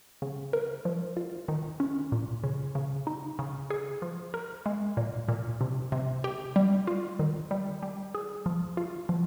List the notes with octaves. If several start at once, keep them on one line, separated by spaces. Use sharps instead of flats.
C#3
A#4
F3
F4
D#3
C#4
A#2
C#3
C#3
D#4
C#3
G#4
F3
A#4
G#3
A#2
A#2
C3
C3
G4
G3
F4
D#3
G3
G3
G#4
F3
F4
F3